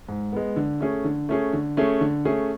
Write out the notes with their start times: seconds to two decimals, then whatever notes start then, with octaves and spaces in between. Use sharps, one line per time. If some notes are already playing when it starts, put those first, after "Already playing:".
0.08 G#2
0.33 G#3 B3
0.56 D3
0.81 A3 C#4 G#4
1.04 D3
1.29 A3 C#4 G#4
1.53 D3
1.77 A3 C#4 G#4
2.01 D3
2.25 A3 C#4 G#4